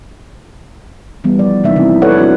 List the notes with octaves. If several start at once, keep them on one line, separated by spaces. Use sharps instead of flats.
E3 G3 B3
F3 D5
C3 E3 A#3 C#4 D#4 E5
C3 E3 C4 E4
A4 B4 C#5 D5 F#5
C4 D4 E4 F#4